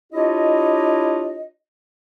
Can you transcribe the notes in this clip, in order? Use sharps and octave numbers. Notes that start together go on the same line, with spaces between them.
D4 E4 F4 G4 C#5 D#5